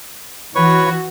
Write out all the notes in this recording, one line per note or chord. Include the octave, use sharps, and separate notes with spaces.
E3 F#4 B4 C#5 C#6